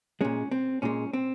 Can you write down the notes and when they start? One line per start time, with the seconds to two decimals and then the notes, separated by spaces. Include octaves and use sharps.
0.21 A#2 G#3 C#4
0.51 C4
0.82 A#2 G#3 C#4
1.13 C4